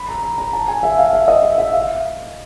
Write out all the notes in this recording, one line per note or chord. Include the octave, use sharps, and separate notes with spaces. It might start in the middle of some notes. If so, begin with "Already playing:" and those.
Already playing: B5
A#5
A#5
A#5
A5
G#5
E5
F5
E5
D#5
E5
E5
F5